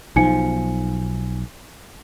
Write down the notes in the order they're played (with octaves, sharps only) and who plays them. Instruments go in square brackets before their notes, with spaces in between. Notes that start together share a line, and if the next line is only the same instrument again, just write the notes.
[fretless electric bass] B1 F3 [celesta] D#4 G#5 C#7